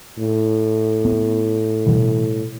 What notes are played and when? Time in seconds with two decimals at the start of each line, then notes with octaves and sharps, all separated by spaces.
0.18 A2
1.05 B3
1.86 B2 E3 G3